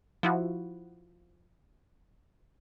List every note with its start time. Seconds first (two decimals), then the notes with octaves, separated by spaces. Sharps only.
0.23 F3 E4 F#4